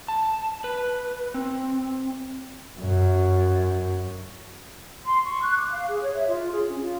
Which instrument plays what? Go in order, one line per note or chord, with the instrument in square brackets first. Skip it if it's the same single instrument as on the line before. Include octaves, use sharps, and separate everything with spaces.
[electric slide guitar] A5
B4
C4
[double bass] F#2
[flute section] C6
C#6
F#6
D6
F5
G#4
C#5
E5
F4
G#4
C#4
F4